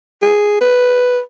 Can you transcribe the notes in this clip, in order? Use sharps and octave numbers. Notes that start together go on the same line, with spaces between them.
G#4
B4